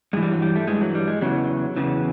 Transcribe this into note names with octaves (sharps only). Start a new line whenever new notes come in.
G2 E3 G#3
G3
F#3
G3
A3
G2 E3 G#3
F#3
G3
G#3
E2 C#3 E3 F#3
E2 C#3 E3